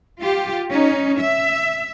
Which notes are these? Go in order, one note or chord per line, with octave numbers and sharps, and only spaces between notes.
F4 G4
C#4 D#4
E5